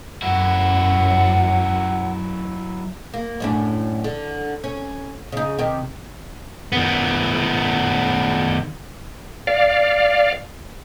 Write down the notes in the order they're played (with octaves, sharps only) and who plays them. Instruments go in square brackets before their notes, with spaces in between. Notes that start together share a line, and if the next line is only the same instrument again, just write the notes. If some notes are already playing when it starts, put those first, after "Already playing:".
[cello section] F#2 [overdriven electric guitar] F#3 E4 [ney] F#5
[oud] A#3
F#2 A2 D4
D3
C#4
C#3 D#4
C3 D#3 G4
[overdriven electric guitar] D#3 B3
[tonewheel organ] D5 F5